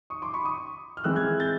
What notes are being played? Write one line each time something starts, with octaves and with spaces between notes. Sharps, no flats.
C#6 D#6
C6 D6
B5 C#6
C#6 D#6
F6
E3 G#3 C4 E6 F#6
F#6 G#6
G6 A6